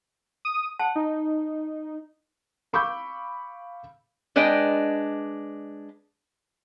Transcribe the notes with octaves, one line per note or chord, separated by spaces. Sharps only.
D#6
F#5 A5
D#4
F5 B5 C#6 D6 E6 G6
G#3 D4 B4 D#5 G5